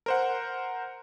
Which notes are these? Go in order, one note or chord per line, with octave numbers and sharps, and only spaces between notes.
A#4 C5 F#5